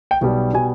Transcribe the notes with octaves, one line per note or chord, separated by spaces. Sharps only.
G5
B1 B2 G3
B2 G3 G#5